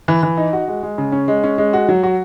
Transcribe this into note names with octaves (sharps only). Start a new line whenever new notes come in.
E3
E3
D#4
F#4
G#3
G#3
C#3
C#4
G#3
C#4
G#3
F#4
F#3
F#4